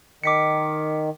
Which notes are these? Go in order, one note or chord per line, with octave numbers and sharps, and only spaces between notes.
D#3 D6 B6 C#7